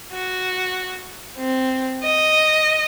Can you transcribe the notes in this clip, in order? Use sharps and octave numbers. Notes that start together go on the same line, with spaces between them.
F#4
C4
D#5